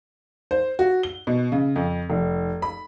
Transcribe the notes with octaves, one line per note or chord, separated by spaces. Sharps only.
C5
F#4
G7
B2
C#3
F2
F1
B5